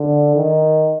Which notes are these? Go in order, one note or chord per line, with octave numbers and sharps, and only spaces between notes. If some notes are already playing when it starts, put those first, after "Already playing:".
Already playing: D3
D#3